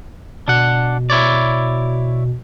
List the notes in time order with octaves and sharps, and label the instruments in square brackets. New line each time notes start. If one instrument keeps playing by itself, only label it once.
[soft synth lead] B2 [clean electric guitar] D4 F#5
[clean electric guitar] E4 C#5 D5